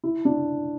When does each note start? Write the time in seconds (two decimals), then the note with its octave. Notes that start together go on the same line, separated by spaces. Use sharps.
0.03 E4
0.25 D4